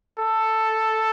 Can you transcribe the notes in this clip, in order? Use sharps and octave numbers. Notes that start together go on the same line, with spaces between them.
A4